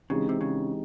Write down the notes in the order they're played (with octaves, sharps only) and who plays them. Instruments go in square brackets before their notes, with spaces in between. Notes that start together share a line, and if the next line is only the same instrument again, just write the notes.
[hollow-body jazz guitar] C#3 [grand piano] E3 G#3 C4 D#4 G4
[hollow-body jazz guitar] C3
C#3